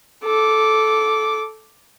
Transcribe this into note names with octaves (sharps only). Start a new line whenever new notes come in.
A4 D6